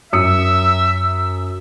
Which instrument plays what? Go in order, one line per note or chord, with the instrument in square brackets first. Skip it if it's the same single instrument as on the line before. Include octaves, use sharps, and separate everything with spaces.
[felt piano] F#2 D#6 C#7 [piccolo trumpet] E5 [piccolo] E6